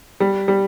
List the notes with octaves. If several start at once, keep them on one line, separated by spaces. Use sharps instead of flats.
G3
G3